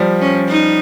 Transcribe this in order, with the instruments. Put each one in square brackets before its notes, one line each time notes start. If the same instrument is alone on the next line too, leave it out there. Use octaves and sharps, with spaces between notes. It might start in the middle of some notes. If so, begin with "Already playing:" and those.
Already playing: [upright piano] F3 G3
[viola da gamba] C#4
D#4